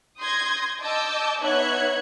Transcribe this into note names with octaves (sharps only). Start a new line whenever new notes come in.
C6 D#6 G6 G#6 A#6
D#5 A5 D6 E6 G6
B3 D#4 C#5 E5 F#6 G#6